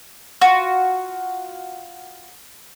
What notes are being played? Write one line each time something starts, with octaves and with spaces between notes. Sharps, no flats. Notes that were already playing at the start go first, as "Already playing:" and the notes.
F4 F#4